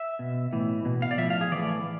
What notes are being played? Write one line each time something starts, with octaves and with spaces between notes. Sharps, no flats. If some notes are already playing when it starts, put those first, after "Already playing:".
Already playing: E5
B2
A2 E3
B2
F5
D5
A2 F3 E5
F5
G#4
A2 E3 D5